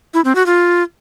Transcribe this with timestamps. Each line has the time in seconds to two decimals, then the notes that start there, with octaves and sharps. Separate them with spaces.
0.14 E4
0.25 C4
0.35 F#4
0.46 F4